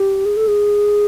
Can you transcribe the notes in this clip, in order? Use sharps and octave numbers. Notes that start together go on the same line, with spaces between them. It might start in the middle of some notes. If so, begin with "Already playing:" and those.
Already playing: G4
G#4
A4
G#4